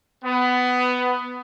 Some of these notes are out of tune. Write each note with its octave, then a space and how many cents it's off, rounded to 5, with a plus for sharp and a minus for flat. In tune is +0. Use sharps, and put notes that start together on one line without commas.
B3 +15